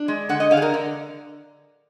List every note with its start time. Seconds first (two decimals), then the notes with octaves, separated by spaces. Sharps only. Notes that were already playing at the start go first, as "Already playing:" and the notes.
Already playing: D4
0.08 G#3
0.29 D3 F#5
0.40 D#5
0.51 D3 F5
0.57 G#4
0.62 A#4
0.74 D3